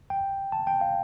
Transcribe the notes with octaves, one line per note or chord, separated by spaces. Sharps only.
G5
A5
G5
F5